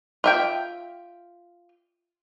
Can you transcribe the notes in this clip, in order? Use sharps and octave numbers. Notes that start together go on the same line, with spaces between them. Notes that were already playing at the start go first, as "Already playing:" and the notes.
F4 E5 G5